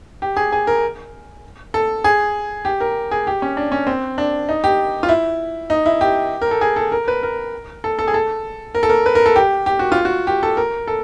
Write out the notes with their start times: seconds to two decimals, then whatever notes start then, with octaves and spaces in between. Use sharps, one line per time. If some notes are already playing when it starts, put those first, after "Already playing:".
0.22 G4
0.37 G#4
0.52 G#4
0.67 A#4
1.74 A4
2.04 G#4
2.65 G4
2.80 A#4
3.11 G#4
3.27 G4
3.42 C#4
3.57 D4
3.72 C#4
3.87 C4
4.18 D4
4.49 D#4
4.64 G4
5.03 F4
5.09 E4
5.70 D#4
5.86 E4
6.01 G4
6.42 A#4
6.51 A4
6.61 G#4
6.76 A4
6.92 A#4
7.08 B4
7.23 A#4
7.84 A4
7.99 A4
8.08 G#4
8.14 A4
8.75 A#4
8.83 A4
8.89 A#4
9.06 B4
9.15 A#4
9.26 A4
9.36 G4
9.66 G4
9.79 F#4
9.92 F4
10.05 F#4
10.27 G4
10.43 A4
10.57 A#4
10.88 A4